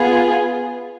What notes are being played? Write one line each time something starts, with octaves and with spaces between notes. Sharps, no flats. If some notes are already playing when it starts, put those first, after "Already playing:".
Already playing: B3 F4 G#4